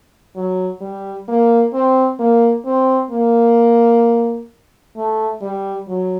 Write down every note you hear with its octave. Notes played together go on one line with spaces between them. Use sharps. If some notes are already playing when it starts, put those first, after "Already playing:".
F#3
G3
A#3
C4
A#3
C4
A#3
A3
G3
F#3